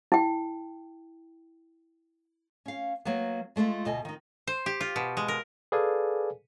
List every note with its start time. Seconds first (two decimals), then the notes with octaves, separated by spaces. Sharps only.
0.12 E4 G5
2.65 C#4 F5
3.05 F#3 A#3 B3
3.56 G#3 A3 D#4 F4 A4
3.85 D2 B2 D#5 G#5
4.05 D#3 D#4
4.47 C5
4.66 G4
4.81 F4
4.96 B2
5.17 G#3
5.28 A#4
5.72 G#4 A4 B4 D5 F5 G#5